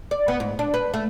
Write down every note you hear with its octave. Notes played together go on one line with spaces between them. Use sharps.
D5
B3
G#2
D4
B4
A3